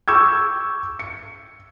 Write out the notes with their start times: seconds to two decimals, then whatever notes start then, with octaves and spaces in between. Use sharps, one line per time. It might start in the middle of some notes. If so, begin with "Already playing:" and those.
0.08 C#6 D6 E6 G6 G#6
0.99 C#7